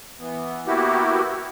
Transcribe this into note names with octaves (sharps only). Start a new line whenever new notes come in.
E3 B3
A#3 B3 E4 F#4 G4